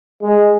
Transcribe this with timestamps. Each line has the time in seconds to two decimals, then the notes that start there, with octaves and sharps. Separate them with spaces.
0.22 G#3